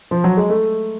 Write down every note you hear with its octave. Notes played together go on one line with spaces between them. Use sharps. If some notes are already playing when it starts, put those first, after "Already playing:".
F3
F#3
G#3
A3